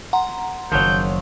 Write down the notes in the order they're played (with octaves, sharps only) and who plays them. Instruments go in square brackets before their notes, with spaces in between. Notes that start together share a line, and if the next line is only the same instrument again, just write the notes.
[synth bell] F#5 A#5 C6
[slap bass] F#1 F#2 D#3 [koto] F3 F#3 [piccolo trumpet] G6